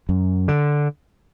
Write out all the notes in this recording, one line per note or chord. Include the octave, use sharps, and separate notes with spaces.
F#2
D3